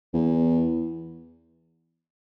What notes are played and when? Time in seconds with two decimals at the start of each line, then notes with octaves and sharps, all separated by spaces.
0.14 E2